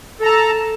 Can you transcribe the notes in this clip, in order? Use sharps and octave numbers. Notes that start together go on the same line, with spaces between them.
A4 A5 A#5